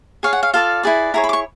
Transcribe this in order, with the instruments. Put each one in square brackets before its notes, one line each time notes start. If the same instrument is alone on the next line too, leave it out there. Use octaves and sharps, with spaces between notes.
[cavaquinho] G#4 C#5 F5
F#5
F5
F4 A4 D5 F5
E4 G#4 B4 D5
E4 G#4 C#5 A#5
B5
D6
C#6